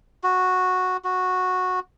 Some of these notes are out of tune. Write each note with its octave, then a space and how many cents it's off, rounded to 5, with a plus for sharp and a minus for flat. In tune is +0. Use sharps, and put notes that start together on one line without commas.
F#4 -5
F#4 -10